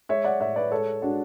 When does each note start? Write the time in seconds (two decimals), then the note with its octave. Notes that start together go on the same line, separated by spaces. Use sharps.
0.09 G#3 C#5 E5
0.24 D5 F#5
0.40 A2 C#5 E5
0.56 B4 D5
0.71 G#3 A4 C#5
1.02 G#3 D4 F#4